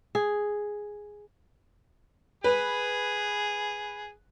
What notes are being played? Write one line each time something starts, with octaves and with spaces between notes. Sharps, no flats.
G#4
G#4 B4